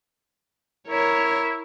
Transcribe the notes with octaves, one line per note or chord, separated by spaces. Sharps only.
E4 A#4 C#5